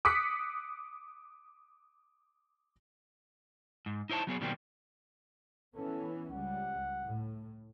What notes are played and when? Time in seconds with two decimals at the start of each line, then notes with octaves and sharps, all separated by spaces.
0.05 D6 D#6 F#6 B6 C#7
3.86 G#2
4.10 D#4 E4 C5 C#5 A5
4.27 F#3 B3 G#4 C#5
4.41 B2 D#3 F#3 G3 A#3 C4
5.75 E3 B3 C#4 A4
6.32 C#2 G3 F#5
7.03 A2